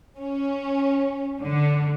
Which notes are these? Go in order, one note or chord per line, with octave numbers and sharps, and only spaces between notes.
C#4
D3